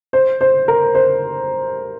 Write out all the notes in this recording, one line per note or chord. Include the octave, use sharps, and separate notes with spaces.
C5
C5
A#4
C5